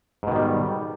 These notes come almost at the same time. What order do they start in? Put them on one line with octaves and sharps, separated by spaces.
G#2 B2 D#3 G3